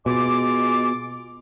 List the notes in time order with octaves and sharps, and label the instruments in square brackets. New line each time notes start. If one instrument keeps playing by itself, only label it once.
[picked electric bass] B2 [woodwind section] G#3 F4 D6